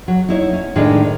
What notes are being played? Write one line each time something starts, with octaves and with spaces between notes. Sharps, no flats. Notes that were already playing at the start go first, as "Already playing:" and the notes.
F#3
D#4 E4 C#5
C#4
A2 D#3 G#3 D4